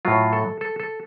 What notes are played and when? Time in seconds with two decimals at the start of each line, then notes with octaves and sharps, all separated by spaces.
0.05 A2 F#3 F4
0.33 A4
0.61 A4
0.80 A4